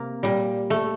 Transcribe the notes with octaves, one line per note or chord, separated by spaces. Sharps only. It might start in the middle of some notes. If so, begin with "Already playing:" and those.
Already playing: C3 A#3
A#2 G3
A3